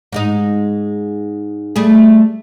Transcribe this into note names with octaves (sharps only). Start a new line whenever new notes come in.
G#2 G#3 D#4
G3 A3 G#4